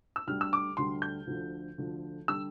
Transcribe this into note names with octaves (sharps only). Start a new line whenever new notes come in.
E6
D2 D3 G3 F6
E6
D6
D2 D3 G3 C6
G6
D2 D3 F3
D2 D3 F3
D3 G3 E6